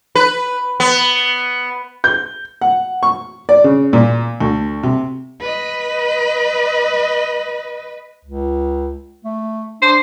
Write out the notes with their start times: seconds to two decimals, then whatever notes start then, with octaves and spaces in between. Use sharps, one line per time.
0.15 B4
0.80 B3
2.04 G6
2.61 F#5
3.03 C#6
3.49 D5
3.64 C#3
3.93 A#2
4.41 D2
4.83 C3
5.41 B4 D#5
8.25 C#2
9.25 A3
9.82 D4 C5